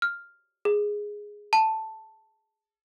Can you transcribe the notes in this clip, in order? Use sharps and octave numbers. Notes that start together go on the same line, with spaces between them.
F6
G#4
A5